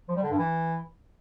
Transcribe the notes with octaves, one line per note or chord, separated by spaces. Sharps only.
F3
G3
D3
G2
E3